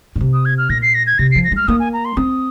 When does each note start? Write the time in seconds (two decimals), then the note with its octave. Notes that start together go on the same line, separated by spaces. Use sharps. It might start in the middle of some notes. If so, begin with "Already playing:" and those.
0.16 A#2
0.21 C3
0.33 D#6
0.45 G#6
0.58 F6
0.69 A#2 A#6
0.82 C7
0.95 A#6
1.07 G#6
1.19 C3 A#6
1.31 C7
1.35 F3
1.44 A#6
1.52 G#3 F6
1.68 A#3 D#6
1.80 G#5
1.93 A#5
2.05 C6
2.17 C4 D#6